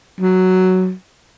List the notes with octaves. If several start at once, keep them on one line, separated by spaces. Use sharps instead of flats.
F#3